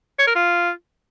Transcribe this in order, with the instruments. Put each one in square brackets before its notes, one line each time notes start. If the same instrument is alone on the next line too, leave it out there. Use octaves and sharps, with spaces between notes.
[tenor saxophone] C#5
A#4
F4